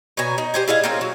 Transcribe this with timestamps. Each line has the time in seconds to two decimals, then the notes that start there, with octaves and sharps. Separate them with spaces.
0.17 B2 C#4 G#5 A#5
0.38 D#4
0.54 G4 C5 G#5
0.68 E4 G#4 D#5 F5
0.84 A#3 C4 C#4
1.01 F#3